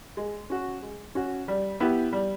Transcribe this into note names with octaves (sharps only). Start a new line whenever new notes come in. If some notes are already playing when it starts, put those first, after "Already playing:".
G#3
C#4 F#4
G#3
C#4 F#4
G3
B3 E4 G4
G3